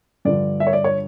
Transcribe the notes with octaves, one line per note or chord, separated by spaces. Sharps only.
G2 D3 F3 D5
E5
C#5
D5
C#5